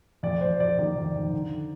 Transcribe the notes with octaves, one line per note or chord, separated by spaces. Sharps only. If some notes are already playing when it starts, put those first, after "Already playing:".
F2 D5
F2 C5
F2 D5
D#3 D5
F2
F2
D3